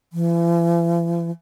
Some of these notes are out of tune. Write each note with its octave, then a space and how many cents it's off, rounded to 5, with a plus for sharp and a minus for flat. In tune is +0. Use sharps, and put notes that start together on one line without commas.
E3 +45